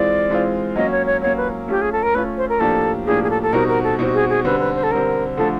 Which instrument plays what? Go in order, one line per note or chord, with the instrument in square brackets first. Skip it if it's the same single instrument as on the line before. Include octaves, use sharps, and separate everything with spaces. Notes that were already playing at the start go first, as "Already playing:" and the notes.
Already playing: [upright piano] E3 G#3 C4 F4 [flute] D5
[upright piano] E3 G#3 C4 F4
[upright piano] F#3 A#3 C#4 [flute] D#5
[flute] C#5
C#5
[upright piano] F#3 A#3 C#4 [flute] C#5
[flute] B4
[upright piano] A3 C#4 F4 [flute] G4
[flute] G#4
A4
A#4
[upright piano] A3 C#4 F4 [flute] B4
[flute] C5
A#4
[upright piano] A2 F3 A#3 D4 G4 [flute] A4
[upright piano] A2 F3 A#3 D4 G4 [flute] G#4
[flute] G#4
A4
A4
[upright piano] B2 G3 C4 D#4 F#4 [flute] A#4
[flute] A#4
A4
[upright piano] B2 G3 C4 D#4 F#4
[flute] G#4
G#4
[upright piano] D3 G3 C4 [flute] B4
[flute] B4
C5
A4
[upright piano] D3 G3 C4 [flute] A#4
[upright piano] D3 F3 A3 [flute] A4